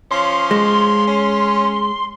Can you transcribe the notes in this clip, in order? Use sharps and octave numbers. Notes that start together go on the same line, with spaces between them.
F3 C#4 C6
G#3
C#4